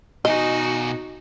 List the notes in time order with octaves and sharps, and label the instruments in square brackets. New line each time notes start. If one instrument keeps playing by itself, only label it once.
[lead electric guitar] B2 G#5 [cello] D#4 F#4 [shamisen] D#5